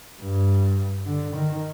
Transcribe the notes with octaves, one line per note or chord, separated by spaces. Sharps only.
G2
D3
D#3